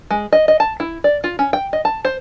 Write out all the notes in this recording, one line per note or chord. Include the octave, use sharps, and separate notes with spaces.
G#3
D#5
D#5
A5
E4
D5
F4
C#4
G5
D#5
A5
C5